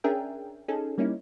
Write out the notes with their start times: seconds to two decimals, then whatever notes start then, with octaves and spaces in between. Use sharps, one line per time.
0.04 C#4 D4 G#4 A#4 E5 G5
0.68 C#4 D#4 G#4 A4
0.98 G3 A#3 C#4 D#4 E4